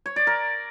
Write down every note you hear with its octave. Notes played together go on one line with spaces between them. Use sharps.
C#5
D5
A#4